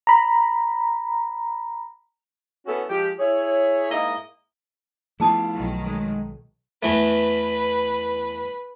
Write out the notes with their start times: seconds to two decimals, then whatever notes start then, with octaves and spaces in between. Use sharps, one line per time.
0.07 A#5 B5
2.66 B3 C#4 E4 F#4 A4
2.90 F3 G#3 G4
3.19 E4 G#4 C#5
3.91 G#2 A#3 E4 D#5
5.20 F3 A3 B3 E4 F4 G#4 A5 D#6
5.54 B1 D#3 F#3
5.86 G#3
6.83 E2 E3 A3 B4